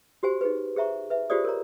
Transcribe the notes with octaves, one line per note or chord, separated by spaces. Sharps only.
F#4 G4 C5 G#5
D#4 G#4 B4
G#4 C5 E5 A#5 C#6
B4 E5
F4 G4 G#4 C5 D5 D#6
A#4 C#5 A#5